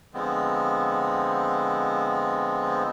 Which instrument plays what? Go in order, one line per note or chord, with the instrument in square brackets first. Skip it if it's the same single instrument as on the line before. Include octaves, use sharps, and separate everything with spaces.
[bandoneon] D3 F3 G#3 B3 C4